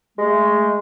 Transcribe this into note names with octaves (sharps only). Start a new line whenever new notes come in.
G#3 A3